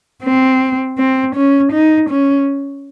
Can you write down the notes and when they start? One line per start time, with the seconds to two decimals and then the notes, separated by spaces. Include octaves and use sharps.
0.24 C4
0.99 C4
1.35 C#4
1.73 D#4
2.10 C#4